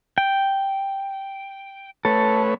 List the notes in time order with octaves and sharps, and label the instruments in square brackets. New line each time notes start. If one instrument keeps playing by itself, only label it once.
[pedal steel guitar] G5
[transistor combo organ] A3 B4 C#5 [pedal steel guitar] A4